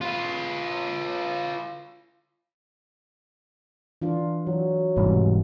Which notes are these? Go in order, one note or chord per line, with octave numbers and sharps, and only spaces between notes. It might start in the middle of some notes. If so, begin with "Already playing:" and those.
F4 B4
E3 D4 F4
E3 F#3
E1 G#2 C3 E3 G3